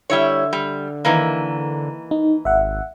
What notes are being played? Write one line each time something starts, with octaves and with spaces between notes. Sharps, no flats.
D3 G3 E4 C#5
G3
D#3 E3 A#3
D#4
G#1 E5 F#5